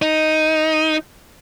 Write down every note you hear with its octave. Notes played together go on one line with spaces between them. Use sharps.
D#4